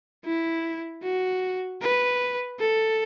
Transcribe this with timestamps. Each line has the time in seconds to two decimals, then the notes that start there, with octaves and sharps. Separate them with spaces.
0.25 E4
1.03 F#4
1.81 B4
2.60 A4